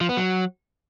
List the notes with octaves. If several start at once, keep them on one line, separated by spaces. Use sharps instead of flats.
F3
B3
F#3